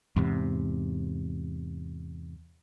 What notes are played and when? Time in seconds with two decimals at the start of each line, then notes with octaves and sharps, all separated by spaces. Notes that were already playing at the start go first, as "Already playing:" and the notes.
0.16 E2 G#2 C3